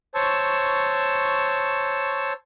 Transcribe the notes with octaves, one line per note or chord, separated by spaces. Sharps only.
C5 C#5 A5 C#6 E6